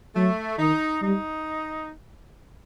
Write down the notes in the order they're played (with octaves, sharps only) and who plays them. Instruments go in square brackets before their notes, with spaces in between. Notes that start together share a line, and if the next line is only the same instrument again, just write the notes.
[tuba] F#3 [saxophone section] A3
[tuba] D#3 [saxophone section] D#4
[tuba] G3 [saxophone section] D#4